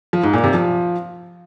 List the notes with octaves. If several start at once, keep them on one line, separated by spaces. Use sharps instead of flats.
F3
G#2
A#2
C3
F3